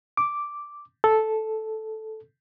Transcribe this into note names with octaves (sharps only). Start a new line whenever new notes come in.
D6
A4